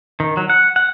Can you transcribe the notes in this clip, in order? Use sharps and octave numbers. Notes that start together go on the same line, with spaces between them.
D#3
F#3
F#5
F#5